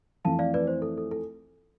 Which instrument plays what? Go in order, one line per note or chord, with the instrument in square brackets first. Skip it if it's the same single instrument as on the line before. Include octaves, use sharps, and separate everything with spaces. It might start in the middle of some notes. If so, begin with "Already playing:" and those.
[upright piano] F2 E3 A3 C4 [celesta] F5 A5
[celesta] D5 F5
B4 D5
C5
A4
A4
A4